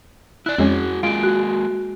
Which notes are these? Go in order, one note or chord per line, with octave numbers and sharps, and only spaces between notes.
E4 D5 F#6
F2 G#3 C#4 F#4 G#4
G#3 A#3 F4 G#4 D7
F#4 F#6